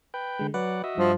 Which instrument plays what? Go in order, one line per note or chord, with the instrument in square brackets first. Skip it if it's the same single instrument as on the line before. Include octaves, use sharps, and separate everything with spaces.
[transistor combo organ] B4 G5
[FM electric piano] D3 G#3
[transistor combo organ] F#3 D5 F#5 [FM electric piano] B4
[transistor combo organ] F#4 D#5 E5
[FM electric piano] G2 [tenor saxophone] F3